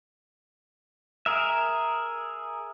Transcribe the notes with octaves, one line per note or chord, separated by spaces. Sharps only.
G#4 A#4 E5